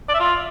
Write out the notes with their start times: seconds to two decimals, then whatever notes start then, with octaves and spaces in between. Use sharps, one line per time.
0.09 D5
0.14 E5
0.20 F4